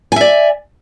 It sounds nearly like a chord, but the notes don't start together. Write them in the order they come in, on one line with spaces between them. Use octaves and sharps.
G#5 E5 D5